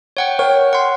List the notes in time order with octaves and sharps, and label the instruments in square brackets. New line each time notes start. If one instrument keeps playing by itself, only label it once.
[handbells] C#5 F#5 G5
[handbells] A#4 [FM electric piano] C#5 G5
[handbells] F#5 C6